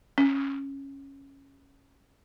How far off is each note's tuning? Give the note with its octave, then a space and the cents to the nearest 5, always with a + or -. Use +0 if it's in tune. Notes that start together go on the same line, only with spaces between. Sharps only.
C#4 -10